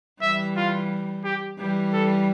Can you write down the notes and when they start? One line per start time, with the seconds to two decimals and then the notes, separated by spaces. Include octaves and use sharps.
0.22 E3 G3 E5
0.56 F4
1.24 G4
1.59 E3 G3 G4
1.93 A4